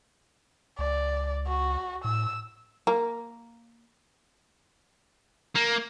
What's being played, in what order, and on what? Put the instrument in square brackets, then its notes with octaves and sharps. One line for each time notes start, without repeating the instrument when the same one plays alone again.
[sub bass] C#2 [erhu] D5
[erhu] F#4
[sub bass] A2 [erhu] E6
[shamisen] A#3 [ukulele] A#5
[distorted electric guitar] A#3